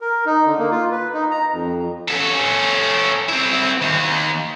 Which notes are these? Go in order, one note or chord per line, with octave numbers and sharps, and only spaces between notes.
A#4
D#4
D3
A#3
F4
B4
D#4
A#5
F2
C#4 A4
C4 E4
D#2